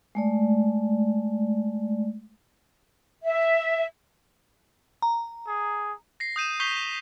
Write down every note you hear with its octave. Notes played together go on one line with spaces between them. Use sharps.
G#3 A3 D5
E5
A#5
G#4
A#6 C7
D#6 G6 D#7 E7
C#6 G6 B6 C7 F7 G7